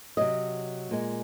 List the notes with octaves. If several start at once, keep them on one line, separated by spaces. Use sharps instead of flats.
C3 F#3 D#5
A#2 G#3